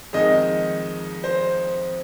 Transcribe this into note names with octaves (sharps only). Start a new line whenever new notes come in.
F2 D#3 G#3 D#5
C5